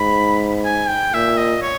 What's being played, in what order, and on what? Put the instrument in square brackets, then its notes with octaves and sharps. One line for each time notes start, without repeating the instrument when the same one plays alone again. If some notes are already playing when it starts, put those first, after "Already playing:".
Already playing: [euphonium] G#2 [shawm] B5
[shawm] G#5
G5
[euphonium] A#2 [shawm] E5
[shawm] D#5
C#5